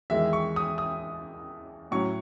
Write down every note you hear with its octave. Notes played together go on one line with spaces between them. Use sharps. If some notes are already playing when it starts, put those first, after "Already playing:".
E2 D#3 G#3 E5
C#6
D#6
D#6
A2 F#3 C#4 C#6